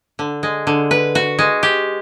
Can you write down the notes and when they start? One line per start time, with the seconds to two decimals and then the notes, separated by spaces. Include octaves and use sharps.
0.19 D3
0.43 G#3
0.67 D3
0.91 B4
1.15 F#4
1.39 G#3
1.63 G4